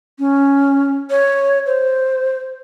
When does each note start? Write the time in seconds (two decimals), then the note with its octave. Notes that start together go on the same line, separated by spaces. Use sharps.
0.19 C#4
1.10 C#5
1.66 C5